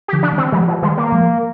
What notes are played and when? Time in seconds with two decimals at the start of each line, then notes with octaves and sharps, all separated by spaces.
0.08 G4
0.13 D3 F3
0.23 D4
0.33 D#3 G3
0.38 C4
0.52 F3 G3 G#3
0.68 F3
0.82 D#3 G3 G#3
0.97 A#3
1.12 F3 G#3